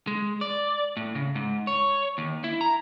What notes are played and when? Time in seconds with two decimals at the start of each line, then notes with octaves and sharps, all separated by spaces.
0.07 G#3
0.41 D5
0.97 A2
1.15 C#3
1.35 G#2
1.67 C#5
2.18 D#2
2.44 E4
2.61 A#5